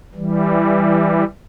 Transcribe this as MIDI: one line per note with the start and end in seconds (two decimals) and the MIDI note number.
0.15 1.24 52
0.15 1.24 55